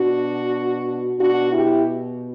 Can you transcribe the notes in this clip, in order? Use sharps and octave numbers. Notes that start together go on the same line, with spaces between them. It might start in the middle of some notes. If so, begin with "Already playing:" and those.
Already playing: B2 D4 F#4
B2 D4 F#4
E4 G4